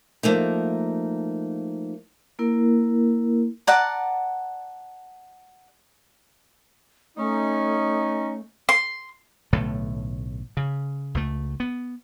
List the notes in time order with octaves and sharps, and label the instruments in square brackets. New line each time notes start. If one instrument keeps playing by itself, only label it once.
[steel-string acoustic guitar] F3 A3 A#3 D#4
[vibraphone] A#3 E4 A#4
[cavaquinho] D5 F#5 A5 A#5
[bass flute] A3 [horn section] C#4 D#4
[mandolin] C6
[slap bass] B1 A2 D3 A3
C#3
C#2 A3
B3